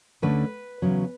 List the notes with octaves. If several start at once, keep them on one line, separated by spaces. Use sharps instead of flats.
D2 D3 A3 C#4 B4
E2 C#3 F#3 C#4